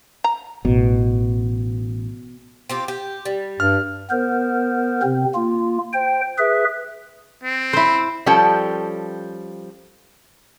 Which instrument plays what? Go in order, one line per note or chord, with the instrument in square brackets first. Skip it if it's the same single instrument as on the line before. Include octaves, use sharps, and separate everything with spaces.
[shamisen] A#5
[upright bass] A1 [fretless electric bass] B2
[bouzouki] C4 F4 G4
G4
G3
[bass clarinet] G2 [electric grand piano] F6
[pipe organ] B3 A#4 C5
C3 C4
A#3 F4
C5 G5
G#4 B4 E5
[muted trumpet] C4
[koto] E4 C5
[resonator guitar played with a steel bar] F3 G3 C#4 A4 G5 A5